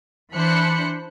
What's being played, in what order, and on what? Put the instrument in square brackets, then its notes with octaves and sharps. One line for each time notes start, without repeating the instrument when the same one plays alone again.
[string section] E3 D4 C5 B5 F#6 C#7